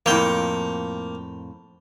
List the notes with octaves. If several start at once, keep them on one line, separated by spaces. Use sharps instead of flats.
F2 A2 A#3 G5